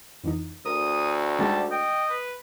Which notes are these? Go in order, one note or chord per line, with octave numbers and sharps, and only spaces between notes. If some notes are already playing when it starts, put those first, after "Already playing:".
F2 E3 D#4
D2 A#4 D#6
D3 G3 G#3 D#4 A5
D#5 G5
B4